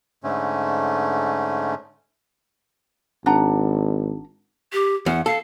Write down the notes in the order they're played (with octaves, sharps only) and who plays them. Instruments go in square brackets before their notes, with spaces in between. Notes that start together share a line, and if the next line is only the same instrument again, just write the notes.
[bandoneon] G#2 D3 A3 C#4
[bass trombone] G#1 [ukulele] D4 F#5 A#5
[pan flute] G4
[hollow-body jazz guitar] E2 [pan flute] F#5
[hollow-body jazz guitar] A4 [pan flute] F5